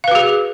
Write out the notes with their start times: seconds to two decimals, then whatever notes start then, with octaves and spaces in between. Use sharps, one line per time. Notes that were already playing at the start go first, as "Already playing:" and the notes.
0.04 F5
0.08 B4
0.11 F#4
0.15 G#4